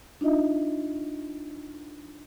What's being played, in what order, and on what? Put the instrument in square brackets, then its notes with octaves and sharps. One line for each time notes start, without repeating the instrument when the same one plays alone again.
[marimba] D4 D#4 F4 D#5 E5